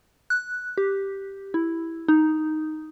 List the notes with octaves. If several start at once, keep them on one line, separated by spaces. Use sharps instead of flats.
F#6
G4
E4
D#4